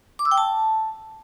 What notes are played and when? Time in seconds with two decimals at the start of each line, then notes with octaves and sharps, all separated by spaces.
0.19 D6
0.25 E6
0.31 G5
0.38 A5